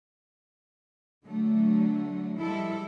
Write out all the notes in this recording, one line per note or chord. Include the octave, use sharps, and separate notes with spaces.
D3 F#3 A3
F3 G3 G#3 E4 A4